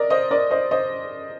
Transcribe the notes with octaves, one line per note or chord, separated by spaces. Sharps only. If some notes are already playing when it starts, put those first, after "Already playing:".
Already playing: A#4 D5 D#5
C5 D#5
A#4 D5
C5 D#5
C5 D#5